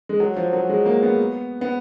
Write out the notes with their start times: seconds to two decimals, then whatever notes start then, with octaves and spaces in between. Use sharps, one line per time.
0.09 G#3
0.20 F#3
0.37 F3
0.53 F#3
0.69 G#3
0.86 A#3
1.03 B3
1.61 B3